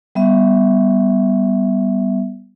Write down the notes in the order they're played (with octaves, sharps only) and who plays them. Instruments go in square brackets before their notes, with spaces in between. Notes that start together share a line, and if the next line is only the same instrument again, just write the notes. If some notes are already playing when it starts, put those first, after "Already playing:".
[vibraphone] G3 B3 E5